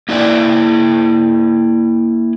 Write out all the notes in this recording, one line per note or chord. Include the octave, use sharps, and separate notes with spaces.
A#3 E4 D5 G5